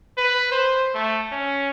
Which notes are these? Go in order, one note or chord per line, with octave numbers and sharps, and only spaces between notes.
B4
C5
A3
C#4